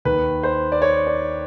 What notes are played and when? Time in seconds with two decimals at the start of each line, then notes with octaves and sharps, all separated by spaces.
0.05 D#2 D#3 B4
0.43 C5
0.72 D5
0.82 C#5
1.07 D5